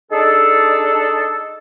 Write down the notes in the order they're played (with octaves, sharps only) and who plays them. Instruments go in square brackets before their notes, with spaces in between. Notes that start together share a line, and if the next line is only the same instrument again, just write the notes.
[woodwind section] D4 D#4 G#4 A4